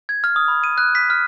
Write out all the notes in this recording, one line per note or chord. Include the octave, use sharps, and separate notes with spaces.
G#6
F6
D#6
B5
D#7
F#6
B6
F6